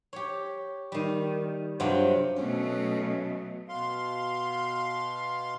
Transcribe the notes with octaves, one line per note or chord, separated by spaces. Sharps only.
G4 C#5
D#3 G3
G2 C3 F#3 F4 G5
B2 F#3 A3 C#4
B2 F5 C6